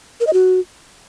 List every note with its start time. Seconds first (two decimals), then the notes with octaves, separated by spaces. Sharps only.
0.20 A#4
0.27 D#5
0.33 F#4